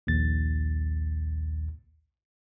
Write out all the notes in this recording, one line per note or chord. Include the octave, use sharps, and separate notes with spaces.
A#1 D#2 A6